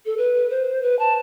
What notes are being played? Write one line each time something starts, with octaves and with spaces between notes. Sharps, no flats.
A4
B4
C5
B4
A5